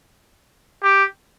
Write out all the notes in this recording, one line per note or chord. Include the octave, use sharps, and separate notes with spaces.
G4